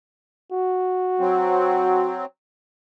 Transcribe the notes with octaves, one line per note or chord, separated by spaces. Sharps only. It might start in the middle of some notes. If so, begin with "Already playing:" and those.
F#4
F#3 C4